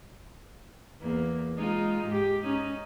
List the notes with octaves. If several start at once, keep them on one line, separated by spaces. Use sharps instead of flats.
E2 A#3
G#3 D#4 F4
G#2 G4
C#4 D#4